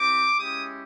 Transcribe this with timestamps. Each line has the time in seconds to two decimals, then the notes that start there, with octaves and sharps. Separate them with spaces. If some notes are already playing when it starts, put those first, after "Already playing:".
Already playing: C4 E4 G4 D6
0.37 G#3 C#4 E4 G4 D#6